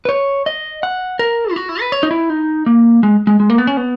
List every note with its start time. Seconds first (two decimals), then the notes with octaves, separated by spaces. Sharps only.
0.05 B4
0.09 C#5
0.46 D#5
0.83 F#5
1.19 A#4
1.51 E4
1.56 F#4
1.69 E4
1.81 B4
1.92 C#5
2.03 D#4
2.11 E4
2.30 D#4
2.66 A#3
3.03 G#3
3.27 G#3
3.40 G#3
3.50 A#3
3.58 B3
3.67 C#4
3.77 B3